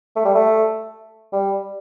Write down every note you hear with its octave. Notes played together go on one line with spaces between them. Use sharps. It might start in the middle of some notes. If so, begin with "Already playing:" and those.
A3
G3
A3
G3